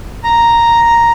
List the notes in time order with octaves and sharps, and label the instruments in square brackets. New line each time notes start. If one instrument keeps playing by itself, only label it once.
[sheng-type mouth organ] A#5